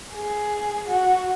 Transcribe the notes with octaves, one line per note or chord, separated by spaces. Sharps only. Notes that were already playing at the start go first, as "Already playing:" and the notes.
G#4
F#4